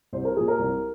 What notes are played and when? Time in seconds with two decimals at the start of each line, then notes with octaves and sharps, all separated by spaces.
0.13 C2 C5
0.25 A#4
0.36 F3 G#4
0.40 A#2
0.48 A#4
0.59 C2